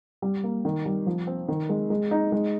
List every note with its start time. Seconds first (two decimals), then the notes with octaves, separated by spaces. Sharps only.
0.22 G3
0.43 A#3
0.65 D#3
0.85 G3
1.06 F3
1.27 C4
1.48 D#3
1.69 G#3
1.90 G#3
2.11 D#4
2.32 G#3